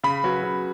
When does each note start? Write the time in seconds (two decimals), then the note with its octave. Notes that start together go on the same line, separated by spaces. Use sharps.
0.04 C#3 B5
0.24 F#3 C#4 F#4 B4
0.43 C#3